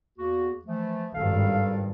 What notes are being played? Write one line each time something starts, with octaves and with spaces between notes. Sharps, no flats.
E2 A#3 F#4
E3 F3 A3
G#1 G2 A4 F5